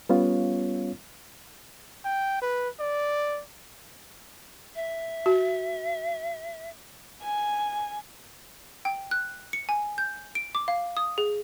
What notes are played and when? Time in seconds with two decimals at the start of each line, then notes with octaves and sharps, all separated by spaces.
0.09 G3 B3 C#4 F4 C#5 F5
2.05 G5
2.42 B4
2.80 D5
4.75 E5
5.26 F#4
7.22 G#5
8.85 G5
9.11 F#6
9.53 C#7
9.69 G#5
9.98 G6
10.35 D7
10.55 D6
10.68 F5
10.97 D#6
11.18 G#4